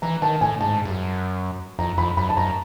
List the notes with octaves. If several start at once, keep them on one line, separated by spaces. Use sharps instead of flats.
E3 A#5
D#3 A5
A2 G#5
G#2 A5
G2
F#2
F2 A#5
F2 B5
F#2 B5
A5
F#2 A#5